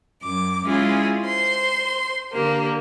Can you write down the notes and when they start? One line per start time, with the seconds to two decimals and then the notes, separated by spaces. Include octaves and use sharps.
0.22 F#2 D6
0.65 G#3 C#4 E4 F4 G#4
1.25 C5 C6
2.33 D3 A#3 G4